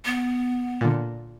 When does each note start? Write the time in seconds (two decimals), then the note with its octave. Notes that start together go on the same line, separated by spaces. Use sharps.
0.05 B3
0.81 A#2 D3